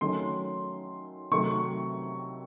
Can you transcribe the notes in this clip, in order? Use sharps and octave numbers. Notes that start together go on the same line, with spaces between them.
D#3 F#3 A3 C#4 C6
C3 D#3 F#3 A3 C#6